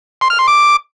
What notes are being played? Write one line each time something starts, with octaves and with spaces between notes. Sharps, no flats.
C6
F6
C6
D6